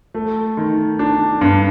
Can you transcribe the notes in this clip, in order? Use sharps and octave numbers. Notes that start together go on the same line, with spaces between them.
A3
D#3
D4
G2